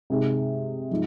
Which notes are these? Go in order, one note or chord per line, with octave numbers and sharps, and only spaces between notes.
C3 G#3 D#4 G#4
F3 G#3 D#4